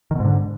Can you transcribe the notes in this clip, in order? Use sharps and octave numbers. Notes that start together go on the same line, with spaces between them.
G#2 B2 D3 D#3